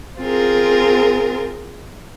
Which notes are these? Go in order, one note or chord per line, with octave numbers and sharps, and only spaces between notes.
C4 F4 G#4 A#4